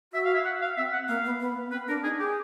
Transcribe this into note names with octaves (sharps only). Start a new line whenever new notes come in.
F#4 E5
F5
E5
F#5
F5
C4 E5
F#5
A#3 F5
B3
B3
C4 B4
D4 A#4
D#4 G#4
G4 G#4